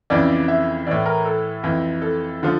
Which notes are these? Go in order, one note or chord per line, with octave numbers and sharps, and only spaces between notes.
F2 C#3 E3 D5
E5
A2 E3 D5
A#4
A4
F2 E3
A4
D3 F3